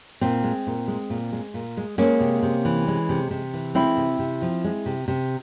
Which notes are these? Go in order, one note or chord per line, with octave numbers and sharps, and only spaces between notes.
A#2 C4
G#3
A#2
G#3
A#2
G#3
A#2
G#3
G#3 A#3 C#4
C3
C3
E3
G#3
C3
C3
E3
G#3 C4 E4
C3
C3
F3
G#3
C3
C3